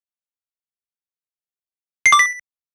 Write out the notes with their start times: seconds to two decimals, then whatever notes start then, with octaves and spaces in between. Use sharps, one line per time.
2.06 C7
2.12 D6
2.19 B6